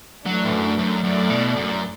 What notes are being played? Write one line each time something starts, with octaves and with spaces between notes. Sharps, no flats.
E3 F#3 A3 D4
A2
F#2
F#2
F#2 A3 E4 D5
B2
F#2